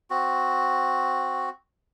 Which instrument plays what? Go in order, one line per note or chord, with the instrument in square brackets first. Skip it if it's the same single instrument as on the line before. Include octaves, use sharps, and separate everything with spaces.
[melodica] C4 F#4